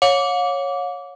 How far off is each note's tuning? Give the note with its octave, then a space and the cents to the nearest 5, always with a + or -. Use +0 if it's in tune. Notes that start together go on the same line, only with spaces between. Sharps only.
C#5 +0 F5 +45 D6 -20